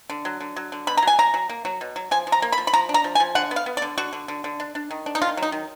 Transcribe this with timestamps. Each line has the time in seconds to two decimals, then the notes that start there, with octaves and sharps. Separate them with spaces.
0.10 D3
0.25 F#3
0.40 D3
0.56 F#3
0.72 D3
0.87 B2 B5
0.97 A#5
1.02 F#3 G#5
1.19 F#3 A#5
1.34 F#3
1.49 A#3
1.65 F#3
1.81 B2
1.96 F#3
2.11 F3 G#5
2.27 F3
2.32 A#5
2.42 A#3
2.52 B5
2.58 F3
2.67 B5
2.73 F3 A#5
2.89 D4
2.94 A#5
3.04 F3
3.15 G#5
3.20 F3
3.35 D3 F#5
3.51 B3
3.56 F5
3.66 B3
3.77 D5
3.82 D3
3.97 D3 F#4
4.13 D3
4.28 D3
4.44 D3
4.60 D4
4.75 D4
4.91 D#3
5.06 D4
5.15 D#4
5.22 D#3 F4
5.37 F#3
5.42 D#4
5.52 D#3